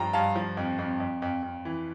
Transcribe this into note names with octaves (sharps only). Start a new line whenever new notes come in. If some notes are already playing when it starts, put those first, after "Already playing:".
Already playing: G2 F3 G5 A#5
G2 F5 A5
F3
F2
F2
F2
F2
F2
E3